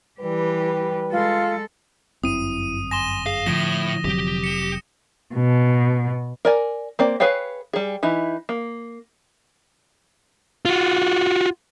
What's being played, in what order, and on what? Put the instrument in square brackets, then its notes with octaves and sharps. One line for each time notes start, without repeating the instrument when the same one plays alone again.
[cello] E3 G4 [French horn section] G3 B4
[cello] G#3 A4 [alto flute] F4
[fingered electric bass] G1 F#2 C4 [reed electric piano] E4 [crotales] D#6 D#7
[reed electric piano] G#5 C6 [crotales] A#6 E7 G7
[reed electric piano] G#4 [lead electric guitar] F5 [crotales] D#6
[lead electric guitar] A2 [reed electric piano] D3 F3 [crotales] A#6
[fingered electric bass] F1 C3 F#3 [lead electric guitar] G4
[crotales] C#7 E7
[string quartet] B2
[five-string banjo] A#4 D5 G#5
A#3 C4 D5
G#4 B4 C#5 F5 G5
G3 G#4
E3 D#4 E4
A#3
[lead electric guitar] F4 F#4